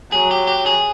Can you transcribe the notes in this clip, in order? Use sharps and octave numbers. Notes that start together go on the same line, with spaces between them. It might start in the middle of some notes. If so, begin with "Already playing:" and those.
F#3 G#4
G4
G4
G#4